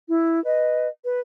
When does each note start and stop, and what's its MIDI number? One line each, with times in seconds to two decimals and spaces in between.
0.08 0.42 64
0.45 0.88 71
0.45 0.88 75
1.05 1.21 71